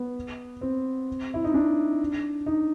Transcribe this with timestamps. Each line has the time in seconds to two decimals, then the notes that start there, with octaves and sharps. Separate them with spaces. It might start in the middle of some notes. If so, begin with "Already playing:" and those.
Already playing: B3
0.61 C4
1.34 E4
1.44 D#4
1.54 D4
2.46 D#4